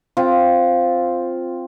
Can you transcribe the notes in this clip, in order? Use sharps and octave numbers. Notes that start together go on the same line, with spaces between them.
C4 F4